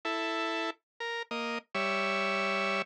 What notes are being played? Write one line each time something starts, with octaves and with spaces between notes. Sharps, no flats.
E4 A4
A#4
A#3 D#5
G3 C#5 E5